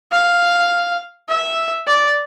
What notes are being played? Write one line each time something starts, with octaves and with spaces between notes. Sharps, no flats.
F5
E5
D5